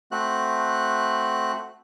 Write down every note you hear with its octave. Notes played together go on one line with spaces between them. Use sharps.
A3 C4 F#4 F#6